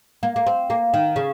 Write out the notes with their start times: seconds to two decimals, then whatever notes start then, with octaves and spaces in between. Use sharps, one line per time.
0.23 A#3
0.36 A#3
0.47 C4
0.70 A#3
0.94 D#3
1.16 C#3